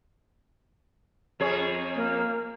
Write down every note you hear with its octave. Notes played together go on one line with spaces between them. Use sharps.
F2 G#4 C#5
A#3